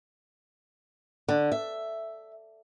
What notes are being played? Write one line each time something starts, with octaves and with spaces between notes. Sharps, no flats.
D3
E5